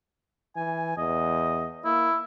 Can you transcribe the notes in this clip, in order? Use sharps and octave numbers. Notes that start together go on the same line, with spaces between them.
E3 G#5
E2 D#5
A#3 E4